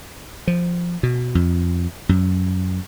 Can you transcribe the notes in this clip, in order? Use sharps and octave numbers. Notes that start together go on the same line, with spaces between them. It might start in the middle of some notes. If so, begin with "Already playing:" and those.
F3
B2
F2
F#2